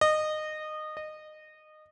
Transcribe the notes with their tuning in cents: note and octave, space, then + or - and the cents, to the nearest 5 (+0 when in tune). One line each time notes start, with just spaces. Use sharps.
D#5 -20
D#5 -20